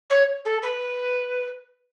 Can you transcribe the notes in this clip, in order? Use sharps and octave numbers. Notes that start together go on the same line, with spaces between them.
C#5
A4
B4